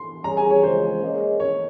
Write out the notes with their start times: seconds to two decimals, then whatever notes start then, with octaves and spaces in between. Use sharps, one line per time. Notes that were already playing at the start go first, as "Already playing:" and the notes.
Already playing: C6
0.24 G3 C#4 G#4 A#5
0.37 G#5
0.50 C#5
0.63 C#3 F3 G#3 C5
1.01 A#3 C#4 G#4 D#5
1.40 C#5